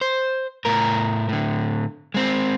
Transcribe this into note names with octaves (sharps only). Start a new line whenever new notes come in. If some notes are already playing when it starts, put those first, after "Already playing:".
C5
A2 A#4
A2 D3
G#3 C4